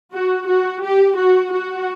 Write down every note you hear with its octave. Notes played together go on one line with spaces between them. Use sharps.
F#4
F#4
G4
F#4
F#4